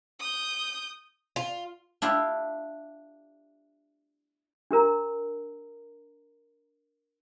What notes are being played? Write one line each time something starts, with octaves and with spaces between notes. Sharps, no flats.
D#6 G6
F4
D4 E4 F4 G4
D4 G4 A#4 A#5